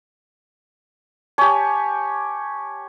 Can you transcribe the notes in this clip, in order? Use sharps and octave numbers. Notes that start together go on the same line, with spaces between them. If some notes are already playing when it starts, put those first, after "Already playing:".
G4 C#5 G#5 A5